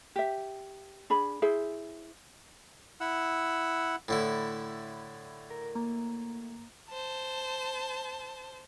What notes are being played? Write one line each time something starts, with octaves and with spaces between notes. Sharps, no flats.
G4 E5
D4 G#4 B5
E4 G#4 C5
E4 F#5 E6
A2 D3 E4 B5
A#4
A#3
C5 A5